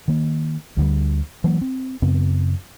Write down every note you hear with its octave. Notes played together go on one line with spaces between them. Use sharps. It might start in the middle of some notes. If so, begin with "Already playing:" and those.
D#3 A#3
D2 D3 G3
E3 F#3 A#3
C4
F#2 C#3 B3 C4